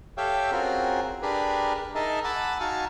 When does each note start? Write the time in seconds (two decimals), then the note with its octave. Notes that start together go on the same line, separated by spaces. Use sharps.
0.17 G4 A4 C#5 E5 F5 G5
0.52 C4 C#4 F4 F#4 G#4 A#4
1.22 D4 G4 G#4 A#4 B4
1.95 D#4 G#4 A#4 D#5 E5 A5
2.24 F#5 G#5 A5 B5 D6 E6
2.60 D#4 F#4 F5 G#5 A5 C#6